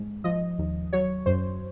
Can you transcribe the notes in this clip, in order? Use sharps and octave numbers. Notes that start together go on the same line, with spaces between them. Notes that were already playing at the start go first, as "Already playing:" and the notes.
Already playing: G#2 G#3
F3 D#5
D#2
F#3 C#5
F#2 C5